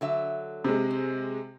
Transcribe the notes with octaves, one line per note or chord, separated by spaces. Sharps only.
D3 F#3 E5
C3 G#3
C5